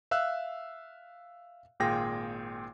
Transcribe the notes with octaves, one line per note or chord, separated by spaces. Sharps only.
E5 F5 E6 F#6
G#1 A#2 F4 G#4 G5 A#6